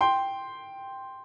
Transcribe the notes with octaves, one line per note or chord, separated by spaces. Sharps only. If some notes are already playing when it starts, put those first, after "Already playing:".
G5 C6